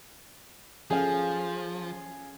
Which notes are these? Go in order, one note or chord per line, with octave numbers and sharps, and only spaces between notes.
F3 C#4 G#4 A4 F5